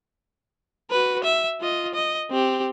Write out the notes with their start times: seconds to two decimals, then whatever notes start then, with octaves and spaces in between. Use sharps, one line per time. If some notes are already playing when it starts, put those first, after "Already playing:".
0.91 F#4 B4
1.24 E5
1.60 F4 D#5
1.94 D#5
2.31 C4 G4